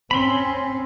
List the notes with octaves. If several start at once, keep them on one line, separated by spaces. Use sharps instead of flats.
C4 C#4 B5 C6